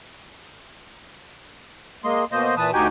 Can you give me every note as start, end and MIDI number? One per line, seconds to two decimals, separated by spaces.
2.04 2.25 56
2.04 2.25 58
2.04 2.25 75
2.04 2.25 84
2.32 2.55 47
2.32 2.55 58
2.32 2.55 72
2.32 2.55 75
2.57 2.71 46
2.57 2.71 52
2.57 2.71 71
2.57 2.71 81
2.57 2.71 87
2.73 2.87 38
2.73 2.87 63
2.73 2.87 66
2.73 2.87 67
2.73 2.87 79
2.73 2.87 80